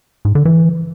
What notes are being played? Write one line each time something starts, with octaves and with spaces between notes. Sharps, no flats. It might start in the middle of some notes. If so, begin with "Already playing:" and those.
G#2
D3
E3